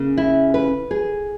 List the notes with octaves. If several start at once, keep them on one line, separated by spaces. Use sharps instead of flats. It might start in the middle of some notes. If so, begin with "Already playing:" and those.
Already playing: C#3 A#3
E4
B4
G#4